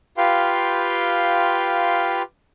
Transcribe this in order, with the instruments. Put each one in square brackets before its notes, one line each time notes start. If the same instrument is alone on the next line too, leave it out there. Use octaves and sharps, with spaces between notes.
[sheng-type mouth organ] F4 G4 B4 F5 G5 C6